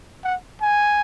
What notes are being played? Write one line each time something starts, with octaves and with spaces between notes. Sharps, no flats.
F#5
G#5